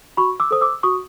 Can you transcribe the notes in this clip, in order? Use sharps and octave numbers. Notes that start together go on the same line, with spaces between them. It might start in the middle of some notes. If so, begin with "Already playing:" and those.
F#4 B5 C#6
D6 E6
A4 C5 D#6
D6 E6
F#4 C#6 D#6